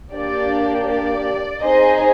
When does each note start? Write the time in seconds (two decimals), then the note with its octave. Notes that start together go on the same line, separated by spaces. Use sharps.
0.13 A#3 D4 G4 D5
0.87 D5
1.62 C4 D#4 G#4 C5 D#5